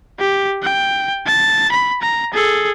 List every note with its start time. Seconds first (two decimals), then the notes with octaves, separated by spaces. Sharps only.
0.19 G4
0.63 G5
1.27 A5
1.72 B5
2.02 A#5
2.34 G#4 A4